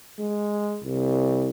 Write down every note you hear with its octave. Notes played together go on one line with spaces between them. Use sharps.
G#3
C2